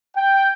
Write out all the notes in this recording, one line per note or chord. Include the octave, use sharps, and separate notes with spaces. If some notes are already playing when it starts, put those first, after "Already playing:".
G5